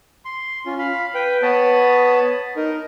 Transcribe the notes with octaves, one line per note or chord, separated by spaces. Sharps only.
C6
C#4 F4
F5 B5
B4 G5
B3 C#5 A5 B5 D#6
D#4 A#4